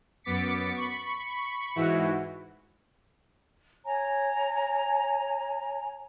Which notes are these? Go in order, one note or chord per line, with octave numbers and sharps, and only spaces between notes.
F#2 B3 D6 A6 B6 C#7
B5 C#6
G#2 E3 E4 F#4
C#5 G#5 A#5